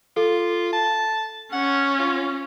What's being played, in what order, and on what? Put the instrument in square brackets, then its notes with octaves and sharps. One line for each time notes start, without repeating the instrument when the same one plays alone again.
[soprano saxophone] F4 [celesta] A4
[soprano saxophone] A5
[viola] C#4 [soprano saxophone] F#5
[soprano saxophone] F4